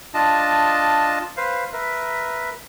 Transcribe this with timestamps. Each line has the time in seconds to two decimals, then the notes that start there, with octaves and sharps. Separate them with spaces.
0.14 D4 F4 D#5 A5
1.37 B4 C5 F5
1.73 A#4 B4 E5